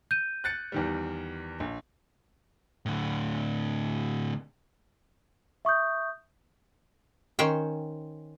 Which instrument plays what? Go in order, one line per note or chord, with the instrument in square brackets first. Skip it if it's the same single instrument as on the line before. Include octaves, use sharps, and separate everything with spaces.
[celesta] G6 D#7
[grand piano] F#6 A6 C#7
E2 D#3 G3
A#1
[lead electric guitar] A2 D3
[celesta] E5 C#6 D#6 G6
[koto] D#3 C#4 C5 G5